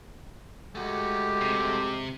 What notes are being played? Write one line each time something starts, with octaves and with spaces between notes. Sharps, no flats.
G#3 A3 F#4 G4
C3